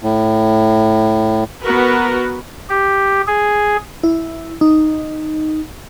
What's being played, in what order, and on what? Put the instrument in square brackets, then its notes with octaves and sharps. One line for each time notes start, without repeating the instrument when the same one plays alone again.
[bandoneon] A2
[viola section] B3 F#4 A#4 B4
[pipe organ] G4
G#4
[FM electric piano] E4
D#4